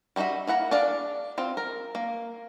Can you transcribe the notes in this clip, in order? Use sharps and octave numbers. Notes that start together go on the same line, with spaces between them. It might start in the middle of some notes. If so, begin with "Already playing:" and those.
G3 C4 D#4 F#4 E5
A#3 E4 F#5 A#5
D4 G#4 D5 F5 A5
C4 F4
A#4
A#3